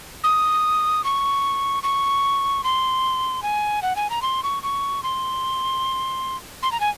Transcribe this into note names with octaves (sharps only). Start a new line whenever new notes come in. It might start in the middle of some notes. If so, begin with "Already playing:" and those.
D#6
C#6
C#6
C6
G#5
F#5
G#5
A#5
C6
C#6
C#6
C6
C6
A#5
G#5